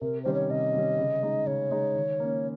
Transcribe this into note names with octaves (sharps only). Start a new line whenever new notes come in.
C3 A#4
D#3 G3 C#4 C5
C#5
C3 D#5
D#3 G3 C#4
C#3
G#3 D#4
C#3 C#5
G#3 D#4
D#3
A#3 C#4